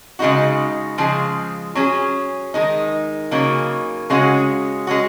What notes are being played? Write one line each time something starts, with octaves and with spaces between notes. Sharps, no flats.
C#3 G#3 D#4 F#4
C#3 F3 G#3
F#3 C#4 G#4
D#3 G#3 D#4
C#3 F#3 A#3 D#4
C#3 G#3 C#4 F#4
G#3 C#4 F#4